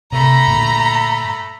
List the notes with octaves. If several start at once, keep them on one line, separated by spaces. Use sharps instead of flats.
C3 A3 A#5 B5
G2 A#2 D3